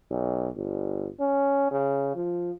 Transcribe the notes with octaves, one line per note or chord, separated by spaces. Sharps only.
B1
G1
C#4
C#3
F3